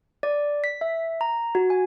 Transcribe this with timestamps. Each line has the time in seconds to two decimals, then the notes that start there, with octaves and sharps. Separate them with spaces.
0.23 D5
0.64 B6
0.81 E5
1.21 A#5
1.55 F#4
1.70 G#5